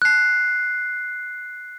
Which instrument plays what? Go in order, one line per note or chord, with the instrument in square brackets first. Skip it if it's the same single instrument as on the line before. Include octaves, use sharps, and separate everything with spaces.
[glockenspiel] F#6 C7